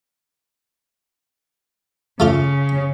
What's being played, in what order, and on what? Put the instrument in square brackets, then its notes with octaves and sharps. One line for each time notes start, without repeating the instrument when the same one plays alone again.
[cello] C#3 [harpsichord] A3 F4 D6